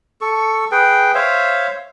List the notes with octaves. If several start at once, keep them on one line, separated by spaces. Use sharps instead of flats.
A4 C#6
G#4 B4 G5
C5 C#5 E5 F5